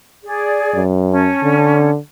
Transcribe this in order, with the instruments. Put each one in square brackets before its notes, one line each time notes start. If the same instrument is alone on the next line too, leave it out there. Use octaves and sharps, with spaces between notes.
[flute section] G#4 D5
[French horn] F#2
[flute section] C#4 A5
[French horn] D3